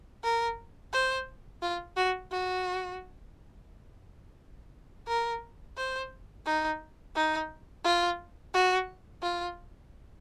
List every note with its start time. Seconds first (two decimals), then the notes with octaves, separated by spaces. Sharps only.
0.24 A#4
0.93 C5
1.62 F4
1.97 F#4
2.31 F#4
5.08 A#4
5.77 C5
6.46 D#4
7.16 D#4
7.84 F4
8.54 F#4
9.22 F4